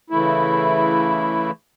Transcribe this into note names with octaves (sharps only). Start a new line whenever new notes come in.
C#3 E3 A3 E4